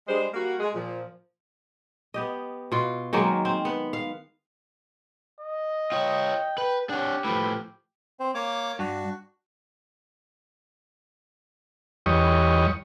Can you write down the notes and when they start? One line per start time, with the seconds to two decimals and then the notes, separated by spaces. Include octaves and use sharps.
0.08 G3 G#3 D4 G#4 C5
0.34 G3 A#3 F#4
0.60 G#3 G#4
0.75 A#2 F3
2.14 B3 G4 D#5
2.72 B2 F4
3.13 D#3 F#3 G#3 A#3
3.45 C4
3.65 B3 B4
3.93 F5
5.40 D#5
5.92 F4 C#5 G5
6.58 B4 G5
6.89 D4 G4 C#5 F#5
7.25 A2 F3 B4
8.20 C4 C5
8.35 A#3 C#5 D6
8.79 G2 D4 F#4
12.06 E2 G3 C#5 D#5